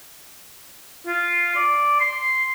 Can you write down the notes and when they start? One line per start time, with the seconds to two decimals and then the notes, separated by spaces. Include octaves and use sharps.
1.06 F4
1.56 D5
2.00 C6